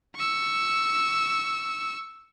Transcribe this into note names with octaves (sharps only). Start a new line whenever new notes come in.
C#6 E6